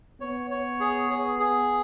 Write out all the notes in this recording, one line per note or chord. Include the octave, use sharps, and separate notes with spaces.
B3 C#5
C#5
G#4
G#4
G#4